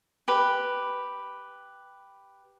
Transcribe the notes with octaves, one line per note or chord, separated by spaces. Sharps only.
G4 B4